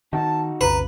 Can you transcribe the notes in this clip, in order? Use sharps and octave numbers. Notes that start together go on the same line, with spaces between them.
D#3 D#4 F#4 A5
B1 F2 C#3 B4 A#5